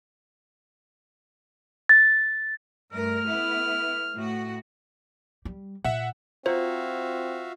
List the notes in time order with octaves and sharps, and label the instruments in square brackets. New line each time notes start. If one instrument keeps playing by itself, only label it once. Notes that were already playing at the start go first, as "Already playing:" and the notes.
[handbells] A6
[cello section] G2 A3 A#4 [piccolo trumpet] F6
[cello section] A3 B3 E4
A2 F#4
[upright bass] G3
[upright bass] A#2 [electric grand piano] E5 F#5
[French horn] C4 [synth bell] F4 [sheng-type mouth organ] F#4 E5 F5 [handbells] C5